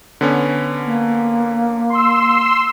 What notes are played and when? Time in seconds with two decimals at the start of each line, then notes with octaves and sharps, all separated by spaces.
0.21 D3 B3 C#4
0.86 A#3
1.90 C6 E6